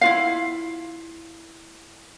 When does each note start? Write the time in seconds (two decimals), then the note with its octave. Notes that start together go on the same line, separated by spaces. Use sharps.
0.01 E4 F4 F5